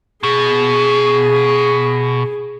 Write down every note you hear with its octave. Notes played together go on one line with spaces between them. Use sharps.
B2 G#4